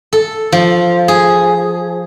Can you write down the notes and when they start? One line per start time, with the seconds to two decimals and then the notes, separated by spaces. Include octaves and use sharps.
0.13 A4
0.52 F3
1.08 G#4